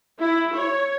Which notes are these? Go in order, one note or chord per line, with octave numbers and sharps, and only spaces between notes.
E4
C#5